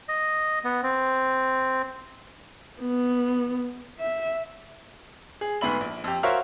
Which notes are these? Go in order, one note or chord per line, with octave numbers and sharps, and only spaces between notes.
D#5
B3
C4
B3
E5
G#4
D2 G#2 B3 E5 B5 F#7
A#1
F2 G4
F#4 A#4 C5 C#5 E5 F5